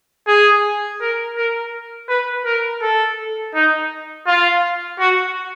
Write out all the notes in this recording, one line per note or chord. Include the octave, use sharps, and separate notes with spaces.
G#4
A#4
A#4
B4
A#4
A4
D#4
F4
F#4